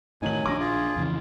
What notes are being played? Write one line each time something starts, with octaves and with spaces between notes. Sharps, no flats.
A2 D#3 F#3 D#4 G#5 F#7
A#1 D4 D6 A#6
F4 G#4
F2 C#3 E3